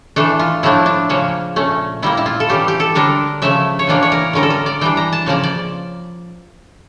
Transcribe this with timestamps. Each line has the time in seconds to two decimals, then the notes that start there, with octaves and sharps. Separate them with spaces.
0.16 E3 A3 D4 A4
0.39 F4
0.63 A2 F3 A3 D4 E4
0.86 D4
1.09 C#3 F3 A#3 C#4
1.56 A#2 A3 C#4
2.02 A#2 G3 A#3 E4
2.17 E4
2.26 F4
2.40 A4
2.49 E3 G3 C#4 G4
2.68 G4
2.80 A4
2.95 D3 G3 D4 A#4
3.42 C#3 F3 A3 E5
3.79 C#5
3.87 A2 E3 A#3 D4 D5
4.03 C#5
4.12 A#4
4.33 D3 G3 C#4 A#4
4.43 A4
4.50 A#4
4.66 D5
4.81 E3 G3 D4 G5
4.97 A#5
5.13 A5
5.26 C#3 F3 A#3 D5
5.43 D5